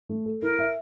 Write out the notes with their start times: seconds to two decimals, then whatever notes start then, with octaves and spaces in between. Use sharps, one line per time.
0.09 A3
0.26 A4
0.42 E4 A#4
0.59 E5